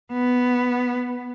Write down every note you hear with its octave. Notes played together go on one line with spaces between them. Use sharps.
B3